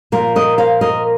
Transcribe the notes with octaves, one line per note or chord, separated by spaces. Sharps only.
A#2 F3 A#3 F4 A#4
A#4 D#5
C5 F5
A#4 D#5